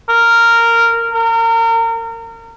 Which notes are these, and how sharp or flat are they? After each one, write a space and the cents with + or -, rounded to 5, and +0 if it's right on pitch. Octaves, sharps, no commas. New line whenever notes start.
A#4 -10
A#4 -30